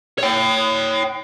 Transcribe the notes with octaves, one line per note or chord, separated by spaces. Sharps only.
C#5 G5